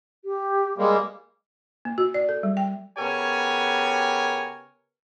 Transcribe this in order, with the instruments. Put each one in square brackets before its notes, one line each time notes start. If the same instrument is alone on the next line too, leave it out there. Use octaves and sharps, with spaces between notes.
[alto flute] G4
[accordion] G3 G#3 A#3
[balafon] A#3
F#4
D5
A4
G3
G5
[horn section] C#3 B3 G4 A#4 C#5 G#5